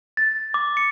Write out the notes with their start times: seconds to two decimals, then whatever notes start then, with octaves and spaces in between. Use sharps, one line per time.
0.17 A6
0.54 D6
0.77 C#7